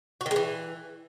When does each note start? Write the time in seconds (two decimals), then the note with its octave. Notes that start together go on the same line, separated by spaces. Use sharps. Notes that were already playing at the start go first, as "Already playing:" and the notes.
0.21 F#4
0.26 D#3
0.31 G#3
0.36 E3